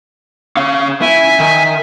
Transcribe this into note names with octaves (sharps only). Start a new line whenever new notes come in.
C#4 F5
E4 E5 G#5
D#3